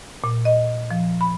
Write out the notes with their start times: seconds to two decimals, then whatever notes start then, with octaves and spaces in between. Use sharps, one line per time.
0.24 A#2
0.45 D#5
0.91 F3
1.21 B5